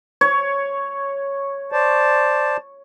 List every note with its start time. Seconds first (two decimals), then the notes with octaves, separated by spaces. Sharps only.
0.21 C#5
1.72 C5 D5 A5